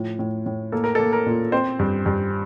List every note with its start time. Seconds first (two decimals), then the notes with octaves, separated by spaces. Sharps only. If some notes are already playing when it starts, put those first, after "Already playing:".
Already playing: A2 F3
0.19 A2
0.46 A2
0.72 A#3 A4
0.84 A#4
0.95 A#3 A4
1.13 A#4
1.26 A#2
1.52 C4 C5
1.79 G2
2.06 G2